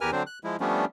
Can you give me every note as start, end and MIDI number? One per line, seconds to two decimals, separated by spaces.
0.01 0.11 40
0.01 0.11 67
0.01 0.11 70
0.01 0.11 71
0.01 0.11 80
0.01 0.11 89
0.12 0.23 50
0.12 0.23 54
0.12 0.23 60
0.12 0.23 62
0.12 0.23 72
0.27 0.39 90
0.44 0.56 53
0.44 0.56 56
0.44 0.56 64
0.60 0.85 53
0.60 0.85 55
0.60 0.85 57
0.60 0.85 59
0.60 0.85 61
0.60 0.85 62